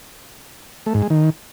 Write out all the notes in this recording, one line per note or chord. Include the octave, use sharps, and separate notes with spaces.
A3
G#2
G#3
D#3